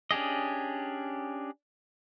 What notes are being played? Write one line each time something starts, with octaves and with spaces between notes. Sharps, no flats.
C#4 D4 G4 G#4 D#5